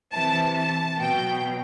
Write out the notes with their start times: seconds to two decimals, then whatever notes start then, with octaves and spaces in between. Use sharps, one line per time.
0.14 C3 E3 A5
0.58 A5
1.01 B2 F#3 G5